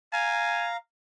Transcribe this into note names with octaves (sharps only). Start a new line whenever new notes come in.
F5 G#5 A#5